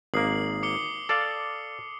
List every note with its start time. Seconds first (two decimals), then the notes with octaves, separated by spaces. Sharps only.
0.14 G#1 A#3 D#6 C7 F#7
0.63 D6 C#7 G7
1.09 A4 D5 F5